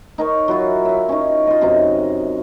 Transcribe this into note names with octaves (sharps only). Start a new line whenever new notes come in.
D#4 A#4 C#5
F#3 E4 F4
E5 F5
C#4 D#4
F4 D#5
F#2 C3 D#4